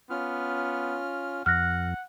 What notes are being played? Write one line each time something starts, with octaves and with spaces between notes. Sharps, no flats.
B3 C#4 F4 F6
F2 F#5 F6 F#6 A#6